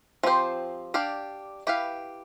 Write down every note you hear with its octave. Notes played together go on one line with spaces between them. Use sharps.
F3 C4 G4 C5
D4 G4 D5 F5
E4 G4 B4 F5